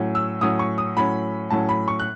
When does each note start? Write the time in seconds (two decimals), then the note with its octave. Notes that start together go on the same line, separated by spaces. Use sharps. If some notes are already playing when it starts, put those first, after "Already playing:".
Already playing: A2 F#3 C#4
0.15 E6
0.41 A2 F#3 C#4 D#6
0.59 C#6
0.78 D#6
0.97 A2 F#3 C#4 B5
1.50 A2 F#3 C#4 A5
1.69 B5
1.88 C#6
2.00 F#6